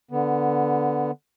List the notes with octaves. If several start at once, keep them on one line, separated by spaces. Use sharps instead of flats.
D3 B3